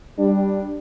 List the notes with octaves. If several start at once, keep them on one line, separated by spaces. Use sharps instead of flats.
G3 D4